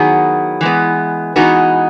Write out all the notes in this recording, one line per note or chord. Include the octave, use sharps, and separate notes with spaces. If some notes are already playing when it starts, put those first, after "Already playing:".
Already playing: D#3 F#3 B3 E4 G#4
E3 G#3 B3
E3 G#3 B3 D#4 F#4